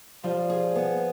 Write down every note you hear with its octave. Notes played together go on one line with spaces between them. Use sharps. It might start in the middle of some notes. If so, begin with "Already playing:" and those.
F3 G3 F4
G#4
B3